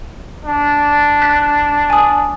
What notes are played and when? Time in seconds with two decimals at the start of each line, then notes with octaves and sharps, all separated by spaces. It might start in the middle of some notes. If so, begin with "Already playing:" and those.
0.45 D4
1.22 F#6 B6
1.90 G#5 D#6